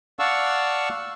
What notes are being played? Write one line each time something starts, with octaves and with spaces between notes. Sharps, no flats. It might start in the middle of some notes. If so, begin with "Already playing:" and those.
D5 F5 F#5 A5 C#6 E6